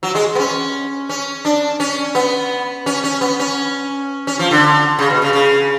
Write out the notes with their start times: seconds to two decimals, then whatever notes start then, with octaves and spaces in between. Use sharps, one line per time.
0.03 F#3
0.15 G#3
0.35 B3
0.39 C#4
1.09 C#4
1.45 D4
1.80 C#4
2.15 B3
2.86 C#4
3.04 C#4
3.21 B3
3.40 C#4
4.27 C#4
4.39 F3
4.51 D3
4.99 C#3
5.10 B2
5.22 C#3
5.33 C#3